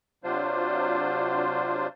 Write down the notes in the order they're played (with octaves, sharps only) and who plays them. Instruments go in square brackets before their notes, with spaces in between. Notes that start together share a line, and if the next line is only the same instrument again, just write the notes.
[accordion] C3 F#3 D4 F4 C5